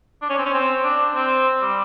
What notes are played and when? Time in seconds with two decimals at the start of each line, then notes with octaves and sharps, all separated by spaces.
0.22 D4
0.30 C#4
0.38 C4
0.45 C#4
0.54 C4
0.84 D4
1.15 C4
1.61 G3